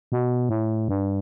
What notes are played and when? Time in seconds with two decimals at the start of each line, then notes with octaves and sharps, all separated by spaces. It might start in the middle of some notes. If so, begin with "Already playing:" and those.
0.12 B2
0.49 A2
0.89 G2